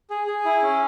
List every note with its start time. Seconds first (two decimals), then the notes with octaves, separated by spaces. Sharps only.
0.10 G#4
0.27 G#4
0.45 E4
0.62 C#4